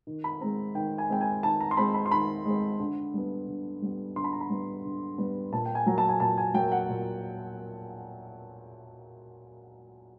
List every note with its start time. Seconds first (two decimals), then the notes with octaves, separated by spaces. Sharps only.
0.07 D#3
0.24 B5
0.41 G#3 C4 A#5
0.75 D#3 G5
0.98 G#5
1.09 G#3 C4 G5
1.21 G#5
1.43 D#3 A5
1.61 A#5
1.71 C6
1.77 G#3 C4 B5
1.94 B5
2.06 C6
2.11 D#3 B5
2.46 G#3 C4
2.79 D3
3.14 G3 B3
3.47 D3
3.82 G3 B3
4.16 D3 C6
4.24 B5
4.33 A#5
4.41 B5
4.50 G3 B3
4.84 D3
5.18 G3 B3
5.52 A#2 A5
5.66 G5
5.75 G#5
5.86 F#3 A#3 A#5
5.98 A5
6.09 G#5
6.20 A#2 A5
6.38 G#5
6.54 F#3 A#3 G5
6.72 F#5
6.89 A#2